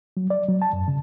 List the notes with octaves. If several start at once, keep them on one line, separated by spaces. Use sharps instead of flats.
F#3
D5
F#3
A5
F#2
C#3